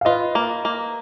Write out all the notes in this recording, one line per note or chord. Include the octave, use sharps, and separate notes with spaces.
F5
F4 B4 D#5
A#3
A#3